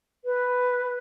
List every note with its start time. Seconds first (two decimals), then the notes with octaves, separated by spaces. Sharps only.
0.25 B4